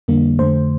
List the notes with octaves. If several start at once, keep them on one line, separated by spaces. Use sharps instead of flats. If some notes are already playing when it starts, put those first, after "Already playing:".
F2 D3 G3 A#3
F2 D3 A3 C5